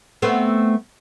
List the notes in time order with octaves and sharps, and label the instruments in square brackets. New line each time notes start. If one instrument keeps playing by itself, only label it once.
[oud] A3 B3 C4